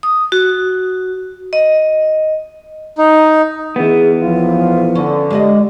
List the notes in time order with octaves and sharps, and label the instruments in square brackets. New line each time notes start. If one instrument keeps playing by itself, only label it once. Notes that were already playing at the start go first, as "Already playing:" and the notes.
[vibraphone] D#6
F#4
D#5
[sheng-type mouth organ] D#4
[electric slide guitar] E3 B3 [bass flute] G#4
[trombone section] B1 F4 [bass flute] F3
[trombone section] D3 [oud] C#4
[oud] G#3 D5 D#5 [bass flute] G4